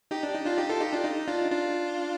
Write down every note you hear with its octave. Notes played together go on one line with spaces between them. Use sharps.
D#4 G4
D4
D#4
D4 F4
D#4 G4
F4 A4
D#4 G4
D4 F4
D#4
D4 F4
D4 F4